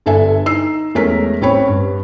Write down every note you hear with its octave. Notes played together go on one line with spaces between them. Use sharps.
G1 D4 A4 E5 G#5
D#4 E6 C7
E2 G#3 A3 C#4 A#4 B6
A1 C4 C#5 B5
G2